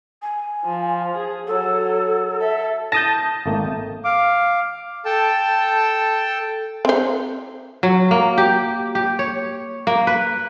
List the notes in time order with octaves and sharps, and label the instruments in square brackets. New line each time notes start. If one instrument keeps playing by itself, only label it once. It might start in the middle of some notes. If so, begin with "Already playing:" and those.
[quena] G#5
[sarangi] F3
G#4
[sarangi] F#3 [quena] A4
[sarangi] A4 [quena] E5
[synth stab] A5 D#6 G6 [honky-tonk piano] A#6
[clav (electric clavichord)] G#1 A3 A#3
[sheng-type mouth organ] F5 D6
A4 G5 A5
[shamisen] C4 C5
[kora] F#3
A#3
G4
G4
C#5
A#3
B4